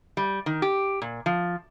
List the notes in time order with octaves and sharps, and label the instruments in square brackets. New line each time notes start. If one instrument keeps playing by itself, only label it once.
[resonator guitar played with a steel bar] G3
D#3
G4
A#2
F3